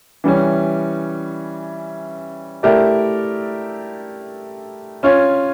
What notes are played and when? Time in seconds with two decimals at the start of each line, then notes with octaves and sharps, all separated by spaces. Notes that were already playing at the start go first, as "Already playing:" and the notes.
0.24 E3 G3 C#4
2.63 A3 E4 G4 A#4 D5
5.03 C#4 F4 C#5